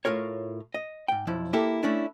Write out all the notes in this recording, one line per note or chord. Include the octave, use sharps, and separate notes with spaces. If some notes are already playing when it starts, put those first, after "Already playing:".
A2 F4 A#4 C#5
D#5
G#2 G5
B1 F2 F3 E4
A#3 E4 G4 A4
A3 C#4 D4 E4